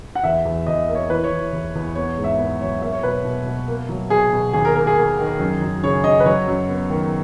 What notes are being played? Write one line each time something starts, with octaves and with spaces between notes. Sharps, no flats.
F#5
E2 E5
E2
E2 D#5
A#3
C#5
E3 B4
C#5
E3
E2
E2
B3 C#5
G#2
E5
B3
F#3 C#5
A#3 E5
C#5
B2 B4
B2
B2
A#3
F#3
B2 G#4
B2
D#2 G#4
A#4
A#3 A#4
G#4
A#3
D#3
F#2
F#2
C#3 C#5
C#3 D#5
B4
F#3 C#5
F#2
B3
D#3